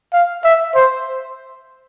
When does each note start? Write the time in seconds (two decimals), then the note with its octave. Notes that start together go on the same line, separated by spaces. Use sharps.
0.13 F5
0.44 E5
0.75 C5